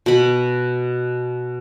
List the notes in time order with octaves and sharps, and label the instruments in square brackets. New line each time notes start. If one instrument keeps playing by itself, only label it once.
[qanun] B2 B5